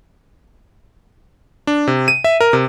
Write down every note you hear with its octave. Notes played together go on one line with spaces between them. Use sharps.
D4
C3
D#7
E5
A#4
C3